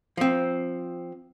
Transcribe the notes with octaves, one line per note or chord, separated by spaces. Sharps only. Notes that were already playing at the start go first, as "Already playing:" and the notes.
F3 C4